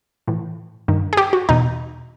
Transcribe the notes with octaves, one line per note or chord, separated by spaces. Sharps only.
A2 E3
G2 D#3
G#4
G4
F#4
E2 B2 D#4